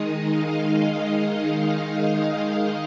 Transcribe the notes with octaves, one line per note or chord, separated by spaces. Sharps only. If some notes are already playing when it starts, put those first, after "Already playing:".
Already playing: D#3 G#3 D#4 D#5
F5
F5